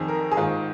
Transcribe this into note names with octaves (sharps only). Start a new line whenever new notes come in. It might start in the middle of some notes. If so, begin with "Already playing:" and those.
Already playing: F2 D#3 G#4
A#4
G#4
G#2 D#3 F4